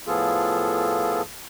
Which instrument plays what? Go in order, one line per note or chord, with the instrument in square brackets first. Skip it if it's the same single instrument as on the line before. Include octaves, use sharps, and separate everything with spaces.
[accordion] A2 F3 B3 F4 G#4 A4